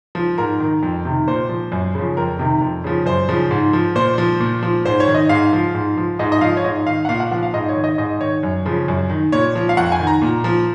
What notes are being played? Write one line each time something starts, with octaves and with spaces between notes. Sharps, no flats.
F3
G#2 A#4
D#3
F2
C3 D#3
A#2 C5
F3
F#2
C#3 F3
F2 A#4
C3 D#3
F2
C#3 F3
F#2 C5
C#3 F3
G#2
F3
A#2 C5
F3
A#2
F3
G#2 C5
C#5
D#3
D#5
G#2 F5
F3
G#2
F3
G#2 D#5
D#5
F3 F5
C#5
G#2 D#5
D#3 F5
F#5
A#2 F5
F#5
F3 F#5
F5
G#2 D#5
C#5
D#3
D#5
G#2 D#5
D#3 C#5
F#2
C#3 F3
F#2
D#3
A#2 C#5
F3
F5
F2 F#5
G#5
D#3
A#5
A#2
F3